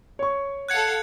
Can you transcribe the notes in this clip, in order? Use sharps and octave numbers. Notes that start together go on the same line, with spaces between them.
C#5 C#6
A4 F5 F#5 F#6 G#6 C#7